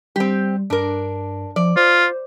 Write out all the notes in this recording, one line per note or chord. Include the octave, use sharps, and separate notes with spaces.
G3 C4 G4
G2 D4 A#4
F3 D5
F4 C5